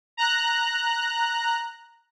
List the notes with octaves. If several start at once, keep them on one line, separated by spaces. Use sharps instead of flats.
A#5 F#6